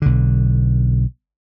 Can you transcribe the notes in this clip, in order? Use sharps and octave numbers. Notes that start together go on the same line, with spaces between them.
B1 D3